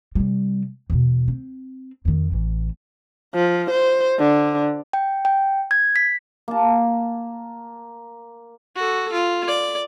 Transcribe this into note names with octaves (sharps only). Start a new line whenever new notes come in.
C3 G3
E2 B2
C4
F2 D#3
A1 E3
F3
C5
D3
G5
G5
G#6
B6
A#3 A5
F#4 A4
F4
D5